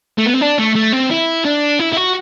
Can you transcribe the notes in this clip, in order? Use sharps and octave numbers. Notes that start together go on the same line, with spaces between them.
A3
B3
C4
D4
A3
A3
C4
E4
D4
E4
E4
F#4